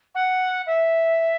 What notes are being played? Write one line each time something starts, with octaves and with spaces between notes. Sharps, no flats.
F#5
E5